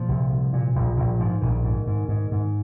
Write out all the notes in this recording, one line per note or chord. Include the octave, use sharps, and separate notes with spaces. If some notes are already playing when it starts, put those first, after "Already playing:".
Already playing: A#2 F3
C2
C2
A#2
A#1
A#1
G#2 F3
A#1 D#3
G#2
G#2
G#2
G#2